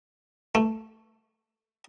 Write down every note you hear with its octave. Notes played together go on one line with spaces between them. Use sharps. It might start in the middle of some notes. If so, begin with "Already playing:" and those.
A3